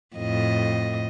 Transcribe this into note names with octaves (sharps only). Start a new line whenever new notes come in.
F2 A2 D#5